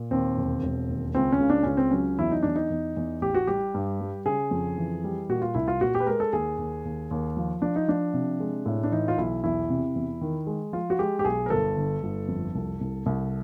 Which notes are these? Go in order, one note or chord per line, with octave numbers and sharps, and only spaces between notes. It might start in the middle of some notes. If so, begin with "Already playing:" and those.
Already playing: A#2
D#2 C4
E1
E1
D#2
C#2 C4
C#4
C#3
D4
C#2 C#4
C4
F#3 C#4
E2 E4
D#4
E2 D4
D#4
E2
E2
A1 G4
F#4
G3 G4
G2
G3
C#3 G#4
F2
E3
G3
A#2 F#4
F4
C2 E4
F4
A#2 F#4
G4
B4
G#3 A#4
A4
D#2 G#4
D#2
D#2
D#2
F3
F3 D4
D#4
F3 D4
C3
G#3
A2
D4
E3 D#4
F4
B1 E4
E2 E4
C3
E2
D#3
G#3
F3 F4
F#4
G#3 G4
G4
B1 G#4
A#4
G1 A4
D3
G1
F2
C2
C2
C2